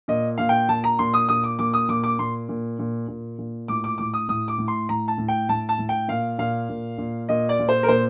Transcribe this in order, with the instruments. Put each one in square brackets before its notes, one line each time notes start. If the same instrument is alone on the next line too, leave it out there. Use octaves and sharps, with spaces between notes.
[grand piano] A#2 D#5
A#2 F5
G5
A#2 A5
A#5
A#2 C6
D#6
A#2 D#6
D6
A#2 D6
D#6
A#2 D6
D6
A#2 C6
A#2
A#2
A#2
A#2
A2 D6
D6
A2 D6
D#6
A2 D#6
D6
A2
C6
A2 A#5
A5
A2
G5
A2 A5
A5
A2
G5
A#2 F5
A#2 F5
A#2
A#2
A#2 D#5
D5
A#2
C5
A#4
A#2 C5